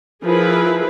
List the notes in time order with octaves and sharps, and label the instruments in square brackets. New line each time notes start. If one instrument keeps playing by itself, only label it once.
[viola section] F3 E4 G#4 A#4 B4